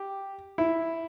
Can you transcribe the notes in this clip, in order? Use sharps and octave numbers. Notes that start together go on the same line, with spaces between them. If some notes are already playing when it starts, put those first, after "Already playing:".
Already playing: G4
E4